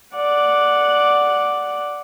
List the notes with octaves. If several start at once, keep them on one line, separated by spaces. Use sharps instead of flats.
D5 F#5